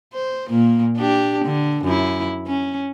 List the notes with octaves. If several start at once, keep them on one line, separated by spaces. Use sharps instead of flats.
C5
A#2 A#3
D4 G4
D3
F#2 E4
C#4